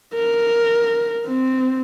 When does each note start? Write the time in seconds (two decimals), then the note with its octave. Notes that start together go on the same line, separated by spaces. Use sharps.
0.15 A#4
1.26 C4